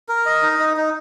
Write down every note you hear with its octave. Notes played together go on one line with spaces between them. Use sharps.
A#4
D#5
D#4
D#4
D#4